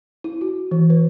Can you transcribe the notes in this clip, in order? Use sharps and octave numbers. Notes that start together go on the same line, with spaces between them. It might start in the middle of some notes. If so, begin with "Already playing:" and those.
E4
F#4
E3
B4